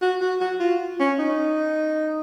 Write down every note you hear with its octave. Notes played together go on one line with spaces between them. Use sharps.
F#4
F#4
F#4
F4
C#4
D#4